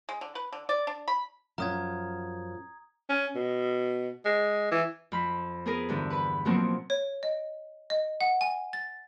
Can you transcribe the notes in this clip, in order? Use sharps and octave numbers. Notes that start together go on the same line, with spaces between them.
G#3
D3
B4
D3
D5
D4
B5
F#2 F3 A#5 D#6 G#6
C#4
B2
G#3
E3
F2 B5
B3 G#4 A#4 B4
E2 G2 D3 E4
B4 B5
B2 F3 F#3 A#3 C4 F#4
C#5
D#5
D#5
F#5
G#5
A6